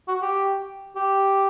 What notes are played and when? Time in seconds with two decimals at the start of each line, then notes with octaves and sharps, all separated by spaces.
0.08 F#4
0.22 G4
0.96 G4